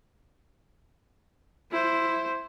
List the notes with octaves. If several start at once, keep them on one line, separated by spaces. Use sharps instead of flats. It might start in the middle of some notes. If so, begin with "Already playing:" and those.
E4 C5